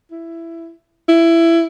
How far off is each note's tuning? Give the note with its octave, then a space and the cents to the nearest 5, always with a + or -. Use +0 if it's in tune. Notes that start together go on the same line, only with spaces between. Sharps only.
E4 +15
E4 +15